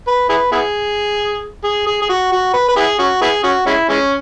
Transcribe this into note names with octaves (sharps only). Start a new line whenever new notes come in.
B4
E4 G#4 B4
B3 E4 G#4
G#4
G#4
G#4
F#4
F#4
B4
B4
B3 E4 G#4
C#4 F#4
B3 E4 G#4
C#4 F#4
G#3 C#4 E4
E3 G#3 C#4